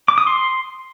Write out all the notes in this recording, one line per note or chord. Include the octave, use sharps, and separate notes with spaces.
D6
D#6
C6